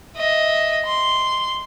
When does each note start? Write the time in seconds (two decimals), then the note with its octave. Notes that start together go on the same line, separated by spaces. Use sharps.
0.16 D#5 E5
0.85 C6